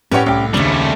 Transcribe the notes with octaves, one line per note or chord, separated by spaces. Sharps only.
A2 C#4 G4 B4 C#5 F#5
C2 C#4 G4
D#2 C#3 G3 A3 C#4 D4 C5